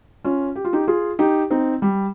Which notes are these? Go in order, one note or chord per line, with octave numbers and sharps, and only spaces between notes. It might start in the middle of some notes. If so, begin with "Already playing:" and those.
C#4 F4
G4
F4
D#4 G4
F4 G#4
D#4 G4
C4 D#4
G3